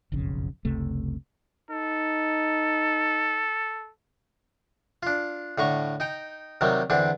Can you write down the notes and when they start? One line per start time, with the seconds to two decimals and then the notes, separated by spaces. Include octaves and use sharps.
0.12 F#1 B1 F2 C#3
0.65 F#1 C#2 C3 A3
1.71 D#4 A4
5.03 D4 F4
5.58 A2 D3 A#5 C#6
6.00 D#4 G5 A#5
6.61 C3 D#3 F#3 G3
6.90 E2 D3 C4 D4